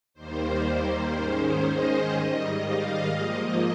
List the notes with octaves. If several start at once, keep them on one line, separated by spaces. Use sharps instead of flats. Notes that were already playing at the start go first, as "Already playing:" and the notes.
D#2 D#3 G3 A#3 C5
C5
G#2 D#3 G#3 C#4
D#5
G#2 D#3 G3
F5
G#2 F3 A#3 D#5